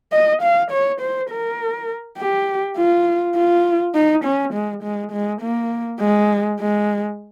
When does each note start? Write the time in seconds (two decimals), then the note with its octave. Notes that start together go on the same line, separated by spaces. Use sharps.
0.12 D#5
0.42 F5
0.71 C#5
1.01 C5
1.30 A#4
2.18 G4
2.77 F4
3.36 F4
3.95 D#4
4.25 C#4
4.54 G#3
4.83 G#3
5.12 G#3
5.41 A#3
6.00 G#3
6.60 G#3